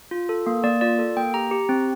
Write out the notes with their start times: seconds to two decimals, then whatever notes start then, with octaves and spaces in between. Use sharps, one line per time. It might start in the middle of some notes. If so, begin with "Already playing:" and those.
0.11 F4
0.29 A4
0.47 A#3
0.64 A#3 D5
0.81 F4 D5
0.99 A4
1.17 A#3 G5
1.34 G4 A#5
1.51 G4
1.69 C4